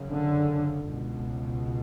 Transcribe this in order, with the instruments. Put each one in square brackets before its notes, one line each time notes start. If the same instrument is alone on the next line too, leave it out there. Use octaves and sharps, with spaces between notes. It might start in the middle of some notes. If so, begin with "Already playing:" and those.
Already playing: [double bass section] F#2 C#3
D3
C#2 B2